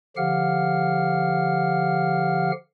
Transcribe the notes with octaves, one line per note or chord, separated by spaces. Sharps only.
D3 F3 G4 F5 F#5 F6